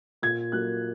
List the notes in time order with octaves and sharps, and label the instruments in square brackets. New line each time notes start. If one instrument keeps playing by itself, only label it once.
[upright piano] A#2 G#6
F#3 A#3 F#6